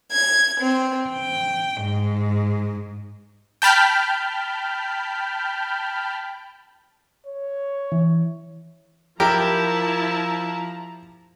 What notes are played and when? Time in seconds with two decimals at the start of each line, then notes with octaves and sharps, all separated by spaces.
0.12 G#6
0.60 C4
1.10 G5
1.82 G#2
3.62 G5 A5 B5 F6 G6
7.27 C#5
7.92 E3
9.20 F3 E4 G4 A#4 A5 A#5